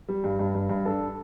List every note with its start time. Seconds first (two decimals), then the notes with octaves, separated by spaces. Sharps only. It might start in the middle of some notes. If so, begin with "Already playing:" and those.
0.08 G3
0.24 G2
0.39 G2
0.55 G2
0.69 G2
0.85 D4 A4